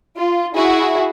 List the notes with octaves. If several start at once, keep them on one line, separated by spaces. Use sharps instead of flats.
F4
E4 F#4 G#4 E5